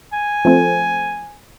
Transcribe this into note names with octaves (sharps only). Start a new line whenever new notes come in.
G#5
F3 A3 C4